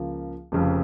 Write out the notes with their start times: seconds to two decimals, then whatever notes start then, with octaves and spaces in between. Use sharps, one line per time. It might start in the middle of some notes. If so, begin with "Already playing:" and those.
Already playing: C#2 C#3 F3 A#3
0.52 F1 F2 C#3 F3